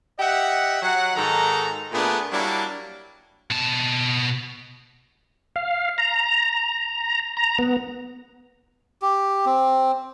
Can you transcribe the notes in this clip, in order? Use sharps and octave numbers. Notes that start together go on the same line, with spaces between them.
G4 D#5 E5 F#5
F#3 F#5
G#2 D#3 F#4 A4 A#5
A#2 A3 B3 D4 G#4
F#3 G3 A#3 D4 E4
B2 A5
F5
A#5
A#5
B3
G4
C4